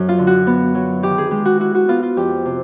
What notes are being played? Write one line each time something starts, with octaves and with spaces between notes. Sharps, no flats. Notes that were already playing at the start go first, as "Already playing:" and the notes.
Already playing: F#2
F4
D3
F#4
B3
F#3
D#3 G4
G#4
G#3 G4
F#4
E4 F#4
F#4
B3 F4
F4
F2 G4
C3